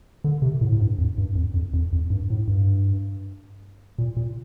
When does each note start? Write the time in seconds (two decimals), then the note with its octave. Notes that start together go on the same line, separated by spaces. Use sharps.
0.24 D3
0.42 C3
0.61 A2
0.72 A2
0.81 G2
0.99 F2
1.18 G2
1.36 F2
1.54 F2
1.74 F2
1.93 F2
2.10 G2
2.30 A2
2.48 G2
3.98 A#2
4.17 A#2